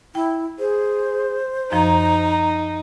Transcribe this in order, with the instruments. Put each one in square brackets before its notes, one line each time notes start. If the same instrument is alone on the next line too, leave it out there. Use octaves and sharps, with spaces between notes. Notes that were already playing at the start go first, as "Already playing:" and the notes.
[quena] E4 [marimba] G5
[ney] G#4 [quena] C5
[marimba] F#2 F3 [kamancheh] D#4 [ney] A#5